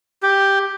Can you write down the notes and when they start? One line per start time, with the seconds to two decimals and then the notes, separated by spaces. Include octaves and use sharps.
0.23 G4